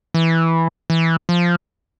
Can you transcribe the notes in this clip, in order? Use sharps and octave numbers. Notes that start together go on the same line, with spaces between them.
E3
E3
F3